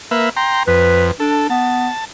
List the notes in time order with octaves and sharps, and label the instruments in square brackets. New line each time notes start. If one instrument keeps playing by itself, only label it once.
[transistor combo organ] A#3 B4 E5
G5 A#5 C6
[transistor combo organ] F2 [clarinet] B4
[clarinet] D4 [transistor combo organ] A4
[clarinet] B3 [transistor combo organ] A5